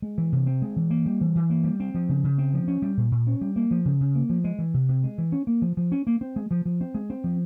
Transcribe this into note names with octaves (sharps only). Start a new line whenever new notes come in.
G#3
E3
C3
C4
G#3
E3
A#3
G3
E3
E3
A#3
G3
C4
F3
C#3
C#3
C4
F3
C#4
G3
A#2
A#2
C#4
G3
A#3
F3
C#3
C#3
A#3
F3
G#3
E3
C3
C3
G#3
E3
C#4
A#3
F3
F3
C#4
A#3
C4
G#3
F3
F3
C4
G#3
C4
F3